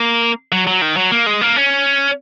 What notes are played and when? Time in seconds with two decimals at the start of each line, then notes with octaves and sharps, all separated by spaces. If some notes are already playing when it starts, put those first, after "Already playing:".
Already playing: A#3
0.52 F#3
0.67 F#3
0.82 D#3
0.97 F#3
1.11 A#3
1.26 G#3
1.41 A#3
1.56 C#4